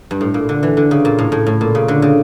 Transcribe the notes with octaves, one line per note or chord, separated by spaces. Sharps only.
G2
A2
A#2
D3
E3
D3
C#3
A#2
A2
A2
A2
A#2
C#3
D3
C#3